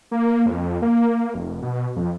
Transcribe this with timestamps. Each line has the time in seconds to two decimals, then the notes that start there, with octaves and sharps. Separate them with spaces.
0.11 A#3
0.46 F2
0.82 A#3
1.34 F1
1.63 B2
1.96 F2